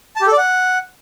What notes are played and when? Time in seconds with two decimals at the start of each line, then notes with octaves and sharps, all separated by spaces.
0.16 A5
0.21 G4
0.27 A4
0.32 D5
0.38 F#5